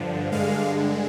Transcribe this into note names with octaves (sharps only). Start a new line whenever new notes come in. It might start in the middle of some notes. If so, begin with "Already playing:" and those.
Already playing: G2 D3 F3
G2 D3 G#3 F5